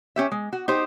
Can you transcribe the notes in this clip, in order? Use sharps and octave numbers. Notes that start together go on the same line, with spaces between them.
C#4 G4 E5
G#3
F#4
D#4 G4 C5